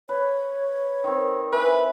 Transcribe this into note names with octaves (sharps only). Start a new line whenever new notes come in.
B4 C#5
D#3 C4
E3 B4